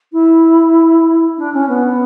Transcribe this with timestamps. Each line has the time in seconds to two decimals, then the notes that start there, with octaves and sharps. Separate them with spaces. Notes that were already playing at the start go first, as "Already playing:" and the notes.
0.12 E4
1.37 D4
1.53 C#4
1.69 B3